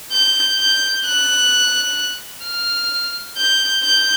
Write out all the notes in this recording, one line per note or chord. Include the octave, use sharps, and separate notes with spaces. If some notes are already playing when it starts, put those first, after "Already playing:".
G6
G6
F#6
F6
G6
G6